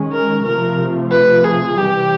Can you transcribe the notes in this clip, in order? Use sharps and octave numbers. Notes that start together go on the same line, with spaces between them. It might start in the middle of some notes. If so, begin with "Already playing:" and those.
Already playing: D#3 G#3 C#4
A#4
C3 F3 A3 A#4
B4
G#4
C3 E3 G3 C4 G4